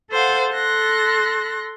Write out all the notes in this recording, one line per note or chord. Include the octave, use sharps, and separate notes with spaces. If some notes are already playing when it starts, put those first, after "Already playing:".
A4 C5 F5 F#5
A4 C6 F#6 A#6